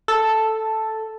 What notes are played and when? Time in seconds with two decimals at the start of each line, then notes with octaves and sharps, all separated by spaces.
0.08 A4